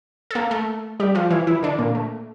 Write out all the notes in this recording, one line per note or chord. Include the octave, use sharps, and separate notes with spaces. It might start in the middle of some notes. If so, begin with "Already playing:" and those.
A4
A#3 A#4
A3 A4
G3 G4
F3 F4
E3 E4
E3 E4
D3 D4
A#2 A#3
A3